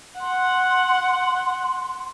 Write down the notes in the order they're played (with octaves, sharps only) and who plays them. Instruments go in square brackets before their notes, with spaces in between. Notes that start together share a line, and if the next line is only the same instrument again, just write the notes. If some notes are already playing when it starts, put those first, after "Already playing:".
[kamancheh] F#5 [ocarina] C6